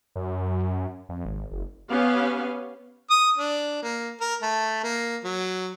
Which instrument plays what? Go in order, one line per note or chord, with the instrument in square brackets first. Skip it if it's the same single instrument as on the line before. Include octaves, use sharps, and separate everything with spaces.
[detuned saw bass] F#2
F2
G#1
F#1
[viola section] B3 C#4 G4 F5
[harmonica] D#6
D4
A#3
A#4
A3
A#3
F#3